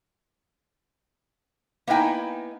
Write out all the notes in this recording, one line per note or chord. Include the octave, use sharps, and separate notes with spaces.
A#3 B3 D#4 E4 G5 G#5